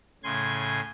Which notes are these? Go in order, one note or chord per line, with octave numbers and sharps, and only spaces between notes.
A2 C#3 G#5 C6 G#6